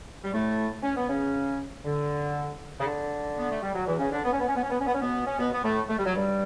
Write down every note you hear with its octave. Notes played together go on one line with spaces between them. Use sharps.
G3
A2 A3
C#4
B3
C#3 C#4
D3
C#3
D3
B3
A3
G3
F#3
E2 E3
C#3 C#4
D3 D4
B3
C#4
B3
C#4
B3
C#4
B3
C#4
B3
C#4
B2 B3
C#4
B2 B3
B3
A2 A3
A3
G3
F#3
G2 G3